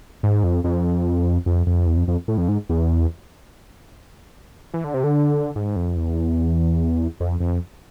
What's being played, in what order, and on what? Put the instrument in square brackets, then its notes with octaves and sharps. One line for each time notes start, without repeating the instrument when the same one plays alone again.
[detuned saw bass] G#2
F2
F2
F2
F2
E2
F2
F2
A2
F2
G#2
E2
E3
D3
C3
D3
G#2
F2
E2
F2
F2